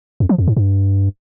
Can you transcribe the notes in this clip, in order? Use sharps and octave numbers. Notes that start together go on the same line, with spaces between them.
F2
F3
F2
G#2
G2